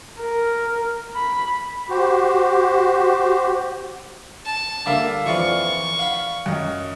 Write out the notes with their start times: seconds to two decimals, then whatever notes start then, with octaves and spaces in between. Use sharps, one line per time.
0.20 A#4
1.15 B5
1.89 F#4 G4 C5
4.45 A5
4.86 D3 G3 A#3 E5 F5 D6
5.26 F2 E3 F4 D5 C#6
5.99 F5 F#5 B5
6.46 F#2 D#5